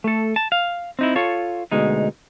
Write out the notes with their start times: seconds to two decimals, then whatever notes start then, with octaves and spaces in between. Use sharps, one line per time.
0.04 A3 A4
0.36 A5
0.52 F5
0.99 C4 D#4 E4
1.16 F4 A4 C#5
1.72 D2 B2 G#3 D#4